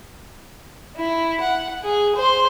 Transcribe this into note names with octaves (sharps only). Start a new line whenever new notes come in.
E4
F#5
G#4
C5 C6